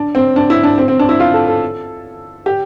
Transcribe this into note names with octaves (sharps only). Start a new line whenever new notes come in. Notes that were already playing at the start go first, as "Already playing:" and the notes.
Already playing: D4
C4
D4
E4
D4
C4
C4
D4
E4
F4
A4
A4
G4